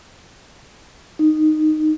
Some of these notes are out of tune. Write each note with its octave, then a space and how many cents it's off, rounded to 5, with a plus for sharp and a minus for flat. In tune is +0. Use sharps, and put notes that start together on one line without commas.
D#4 -10